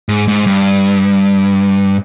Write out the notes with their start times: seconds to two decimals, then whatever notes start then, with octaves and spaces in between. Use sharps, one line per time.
0.09 G#2
0.28 G#2
0.47 G2